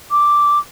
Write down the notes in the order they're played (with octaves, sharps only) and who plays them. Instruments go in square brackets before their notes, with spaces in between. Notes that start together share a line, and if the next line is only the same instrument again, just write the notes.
[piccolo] D6